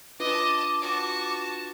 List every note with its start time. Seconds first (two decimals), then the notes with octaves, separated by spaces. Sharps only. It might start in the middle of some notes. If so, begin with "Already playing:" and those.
0.20 D4 F4 B4 D#5 A5 D6
0.81 F#4 A5